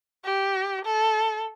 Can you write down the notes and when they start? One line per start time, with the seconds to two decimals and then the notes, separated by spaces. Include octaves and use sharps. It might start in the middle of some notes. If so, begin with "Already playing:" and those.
0.24 G4
0.85 A4